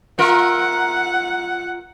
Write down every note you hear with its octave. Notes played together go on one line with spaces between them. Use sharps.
F4 A#4 E5 F#5